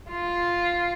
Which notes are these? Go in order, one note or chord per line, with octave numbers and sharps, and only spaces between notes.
F4